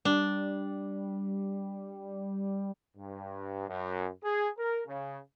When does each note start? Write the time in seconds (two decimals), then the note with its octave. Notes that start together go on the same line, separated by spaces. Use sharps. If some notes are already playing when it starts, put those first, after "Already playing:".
0.05 G3 D4
2.96 G2
3.68 F#2
4.23 G#4
4.57 A#4
4.86 C#3